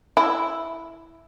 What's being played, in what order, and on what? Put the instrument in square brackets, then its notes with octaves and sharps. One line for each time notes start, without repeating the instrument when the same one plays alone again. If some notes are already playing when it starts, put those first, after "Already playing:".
[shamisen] E4